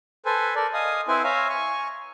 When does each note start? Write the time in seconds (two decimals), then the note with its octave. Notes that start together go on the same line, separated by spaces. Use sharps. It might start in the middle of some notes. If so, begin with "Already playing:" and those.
0.26 A4 B4 C5 G#5
0.56 A4 A#4 D5
0.73 D#5 F5 G#5 D#6
1.08 C4 E4 B4 C5 G#5
1.24 C#5 E5 F5 G#5 A#5
1.49 G#5 C#6